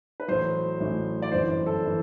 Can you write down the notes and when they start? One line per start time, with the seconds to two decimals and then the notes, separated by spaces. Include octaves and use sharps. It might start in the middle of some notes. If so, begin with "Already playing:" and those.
0.20 B4
0.28 A1 A2 F#3 C5
0.80 A1 A2 F#3
1.22 D5
1.32 G1 F#2 E3 C5
1.66 A4
1.86 E3